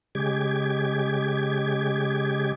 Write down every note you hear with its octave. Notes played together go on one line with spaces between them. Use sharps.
C#3 G#3 G4 G#6